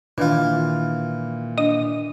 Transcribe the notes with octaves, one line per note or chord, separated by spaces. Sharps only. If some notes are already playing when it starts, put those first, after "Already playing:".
A#2 D#3 E3 D4 F4
D4 D#5